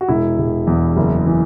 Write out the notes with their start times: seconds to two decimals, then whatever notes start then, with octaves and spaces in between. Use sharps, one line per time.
0.01 F#4
0.08 E1 E4
0.39 E1
0.67 E2
0.97 F#1
1.26 E3